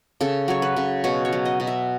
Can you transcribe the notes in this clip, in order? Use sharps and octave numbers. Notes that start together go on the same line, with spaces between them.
C#3 A4
F#3 C#5
B4
C#3
B2 C#5
C#5
F#3
D#5
B2
E5